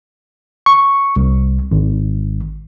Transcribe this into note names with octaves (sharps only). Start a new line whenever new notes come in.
C#6
C2
G#1